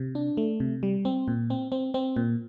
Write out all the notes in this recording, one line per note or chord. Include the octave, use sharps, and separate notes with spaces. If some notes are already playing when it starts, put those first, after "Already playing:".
Already playing: C3
D4
A3
C3
G3
C4
A#2
C4
C4
C4
A#2